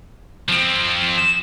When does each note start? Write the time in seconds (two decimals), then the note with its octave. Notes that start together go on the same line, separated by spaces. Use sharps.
0.49 F3 C4
1.17 E7